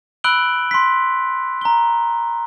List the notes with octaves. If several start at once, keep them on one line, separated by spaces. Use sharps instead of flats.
B5 E6 F#6 D7 F#7 G7
C6 B6
A#5 G7